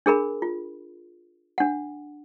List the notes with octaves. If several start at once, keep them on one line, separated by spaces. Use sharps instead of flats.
D4 G#4 A#4 B5
F4
D4 F#5